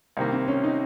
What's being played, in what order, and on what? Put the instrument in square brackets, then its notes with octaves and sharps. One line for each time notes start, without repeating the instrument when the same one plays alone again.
[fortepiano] C2 C3 D#3 A#3
[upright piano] C4
C#4
D#4